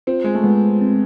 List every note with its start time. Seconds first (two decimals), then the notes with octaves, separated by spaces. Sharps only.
0.07 C4 F4
0.24 G#3
0.34 A3
0.44 G#3 B3
0.81 C4